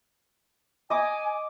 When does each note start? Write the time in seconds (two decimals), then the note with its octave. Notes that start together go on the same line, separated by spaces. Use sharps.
0.90 D#5 G#5 D6